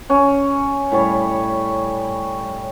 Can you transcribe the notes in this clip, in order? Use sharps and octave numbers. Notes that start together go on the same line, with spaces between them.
C#4
A2 G3 C#5